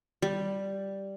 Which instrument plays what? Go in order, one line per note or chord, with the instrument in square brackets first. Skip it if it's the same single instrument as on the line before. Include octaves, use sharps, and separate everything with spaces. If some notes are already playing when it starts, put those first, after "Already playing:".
[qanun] G3